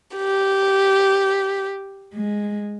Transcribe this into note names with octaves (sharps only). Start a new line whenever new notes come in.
G4
G#3